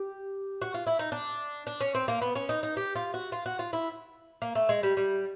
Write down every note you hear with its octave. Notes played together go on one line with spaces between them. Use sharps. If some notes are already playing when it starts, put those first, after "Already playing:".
Already playing: G4
F#4
F4
E4
D#4
D4
D4
C#4
C4
A#3
B3
C#4
D#4
D#4
G4
F4
F#4
F4
F#4
F4
E4
A#3
A3
G#3
G3
G3